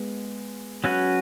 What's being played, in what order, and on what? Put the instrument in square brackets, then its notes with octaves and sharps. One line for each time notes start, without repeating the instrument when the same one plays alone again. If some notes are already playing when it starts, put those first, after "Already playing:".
Already playing: [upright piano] G#3 B3
[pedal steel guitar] F#3 C#4 F#4 B4